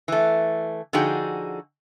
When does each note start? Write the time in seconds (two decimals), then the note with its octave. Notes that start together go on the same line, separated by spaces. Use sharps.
0.08 E3 A3
0.93 D3 F3 D#4 F#4 G#4 G5